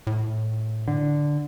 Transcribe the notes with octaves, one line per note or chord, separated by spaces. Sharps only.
A2
D3